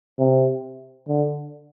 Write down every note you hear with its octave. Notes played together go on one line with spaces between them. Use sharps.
C3
D3